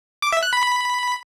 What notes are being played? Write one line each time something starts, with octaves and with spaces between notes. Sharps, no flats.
D6
E5
F#6
B5
B5